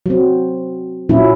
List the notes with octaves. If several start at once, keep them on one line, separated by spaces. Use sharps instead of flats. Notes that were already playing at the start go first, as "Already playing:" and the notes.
F#3 C4
A#2 F#3 C#4 E4